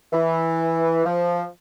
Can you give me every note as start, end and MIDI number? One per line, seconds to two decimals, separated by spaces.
0.13 1.01 52
1.06 1.44 53